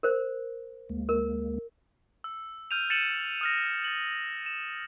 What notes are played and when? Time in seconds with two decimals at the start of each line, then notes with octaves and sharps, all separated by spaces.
0.03 A#4 C5
0.89 D2 G#3 A#3
1.09 A#4
2.24 E6
2.71 F6 G6 D#7 F7
2.90 A6 C#7 D#7 E7 F#7
3.41 D#6 F6 A#6
3.84 A6 F#7
4.46 E7